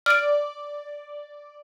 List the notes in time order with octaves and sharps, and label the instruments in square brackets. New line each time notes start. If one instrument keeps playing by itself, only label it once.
[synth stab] D5 [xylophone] F6 D7